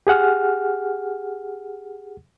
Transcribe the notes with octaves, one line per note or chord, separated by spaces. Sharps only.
G4 G#4 F#5 F6